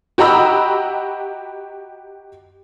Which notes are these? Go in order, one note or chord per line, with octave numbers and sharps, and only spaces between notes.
F#4 G4 D#5 A#5 B5 E6